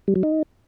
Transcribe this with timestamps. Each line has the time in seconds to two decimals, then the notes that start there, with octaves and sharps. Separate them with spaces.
0.08 G3
0.16 F#3
0.23 D#4